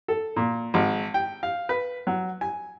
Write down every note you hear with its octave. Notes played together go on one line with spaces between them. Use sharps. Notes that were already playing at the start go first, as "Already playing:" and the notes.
A4
A#2
G#1
G5
F5
B4
F#3
G#5